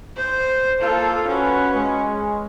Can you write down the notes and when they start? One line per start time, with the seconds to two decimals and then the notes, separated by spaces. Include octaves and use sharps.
0.17 C5
0.82 A#3 F4 A4
1.28 C#4 F#4 B4
1.74 G#3